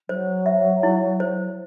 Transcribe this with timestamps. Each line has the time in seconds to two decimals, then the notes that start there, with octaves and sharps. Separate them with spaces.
0.09 F#3 C5
0.46 E5
0.83 E4
1.20 C5